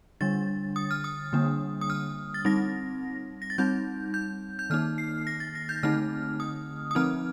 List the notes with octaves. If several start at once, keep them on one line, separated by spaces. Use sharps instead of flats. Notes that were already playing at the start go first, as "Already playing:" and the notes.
D3 G3 D4 A6
D#6
F6
D#6
D3 G3 A#3 D4
D#6
F6
A6
G3 C4 D#4 A#6
A#6
A6
G3 C4 D#4 G6
G6
G6
D#3 A#3 D#4 F6
C7
A#6
A6
A#6
G6
D3 A3 C4 D#4 F6
D#6
D#6
F3 C4 D#4 F6